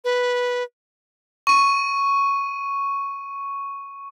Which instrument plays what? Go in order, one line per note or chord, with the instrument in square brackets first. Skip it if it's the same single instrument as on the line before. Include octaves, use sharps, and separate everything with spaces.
[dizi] B4
[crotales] C#6 D#7